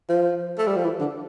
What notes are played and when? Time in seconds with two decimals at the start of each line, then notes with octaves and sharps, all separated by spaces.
0.09 F3
0.58 A3
0.67 G3
0.76 F3
0.84 E3
1.00 D3